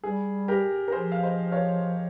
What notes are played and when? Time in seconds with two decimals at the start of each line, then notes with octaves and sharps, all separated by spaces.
0.03 G3 G#4
0.48 G4 A#4
0.88 A#4
0.92 F3 G#4 C5
1.12 F5
1.23 C5 D#5
1.52 C#5 F5